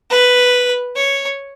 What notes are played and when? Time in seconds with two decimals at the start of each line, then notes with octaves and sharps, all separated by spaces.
0.10 B4
0.96 C#5